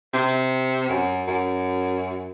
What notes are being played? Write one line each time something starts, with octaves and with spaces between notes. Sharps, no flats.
C3
F#2
F#2